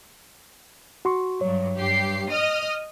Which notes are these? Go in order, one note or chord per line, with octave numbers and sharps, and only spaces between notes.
F#4 C6 C#6
G2 F#3 C#5
G2 G4 C7
D#5 D#6 F6